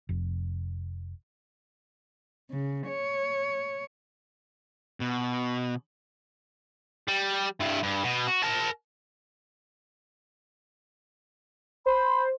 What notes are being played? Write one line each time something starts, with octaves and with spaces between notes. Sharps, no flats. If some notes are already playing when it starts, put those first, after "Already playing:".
F1
C#3
C#5
B2
G3
G2 E4
G2
B2
F#4
A#4 A5
C5 B5